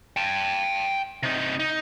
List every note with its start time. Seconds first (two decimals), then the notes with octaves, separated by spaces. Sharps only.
0.17 G5 A5
1.23 C3 D#4
1.60 D#4